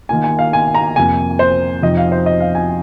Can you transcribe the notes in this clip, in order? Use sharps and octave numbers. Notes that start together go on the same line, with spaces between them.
D#3 A#3 F4 G#5
G#5
F5
G#5
A#5
F2 C3 F3 A#3 G#5
C5
F2 C3 F3 C4 D#4 D#5
F5
C5
D#5
F5
G#5